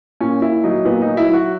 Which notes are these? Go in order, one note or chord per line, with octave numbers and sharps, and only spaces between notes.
A#2 C#4
A#2 E4
F#3 D#4
A#2 B3
D#4
F#3
E4
F#3 F#4